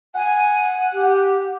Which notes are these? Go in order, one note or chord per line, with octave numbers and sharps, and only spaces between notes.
F#5 G#5
G4